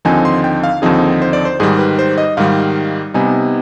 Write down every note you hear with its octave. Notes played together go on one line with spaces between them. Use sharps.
D#2 D3 F3 C4 D#4 G#5
C6
G5
F5
D#2 D3 F3 C4 D#4 G#4
C5
D5
C5
G#2 D#3 G3 G#4
B4
C5
D#5
G#2 D#3 G3 F5
C3 G3 B3 D#4 G#5